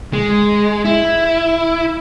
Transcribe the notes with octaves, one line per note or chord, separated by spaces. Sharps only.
G#3
E4